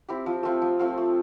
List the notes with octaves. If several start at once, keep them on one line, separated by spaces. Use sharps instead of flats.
C4 E4 G4
F3
A3 C4 F4
F3
A3 C4 F4
A3